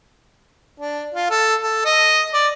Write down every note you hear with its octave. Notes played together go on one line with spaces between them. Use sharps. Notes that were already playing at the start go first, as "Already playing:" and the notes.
D4
F4
A4
A4
D#5
D5